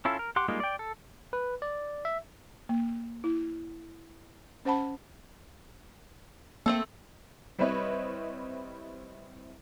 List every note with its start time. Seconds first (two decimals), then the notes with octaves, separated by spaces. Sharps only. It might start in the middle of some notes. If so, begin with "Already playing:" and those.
0.05 C#4 E4 F4 A4
0.19 A#4
0.36 G4 F#5 C6 D6
0.48 G3 G#3 A#3 D#4 F4
0.60 D5 G5
0.79 A4
1.33 B4
1.62 D5
2.05 E5
2.69 A#3
3.24 E4
4.65 C#4 C5 F#5 A5 B5
6.66 A3 A#3 C4 A4
7.59 G3 C4 E4 B4 C#5 D#5